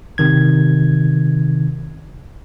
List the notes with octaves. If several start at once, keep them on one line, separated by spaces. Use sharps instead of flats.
C3 D#3 G#6